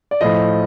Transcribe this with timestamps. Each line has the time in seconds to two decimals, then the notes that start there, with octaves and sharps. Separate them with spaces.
0.11 D5
0.21 A2 F3 D#5